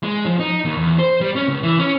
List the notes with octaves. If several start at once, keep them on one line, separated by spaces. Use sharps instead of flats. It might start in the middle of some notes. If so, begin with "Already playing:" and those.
G#3
F3
D#4
D#2
E2
C5
G3
C#4
C#2
E3
C#4